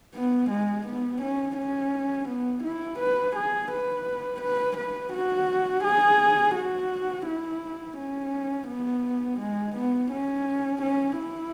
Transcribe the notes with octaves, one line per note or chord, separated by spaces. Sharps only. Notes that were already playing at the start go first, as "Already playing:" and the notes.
B3
G#3
B3
C#4
C#4
B3
E4
B4
G#4
B4
B4
B4
F#4
G#4
F#4
E4
C#4
B3
G#3
B3
C#4
C#4
E4